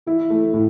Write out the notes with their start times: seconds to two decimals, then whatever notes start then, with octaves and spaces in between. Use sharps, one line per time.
0.06 E3 E4
0.30 A3
0.54 A2